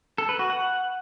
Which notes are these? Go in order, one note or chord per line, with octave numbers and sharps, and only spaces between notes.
A4
B4
F#4
F#5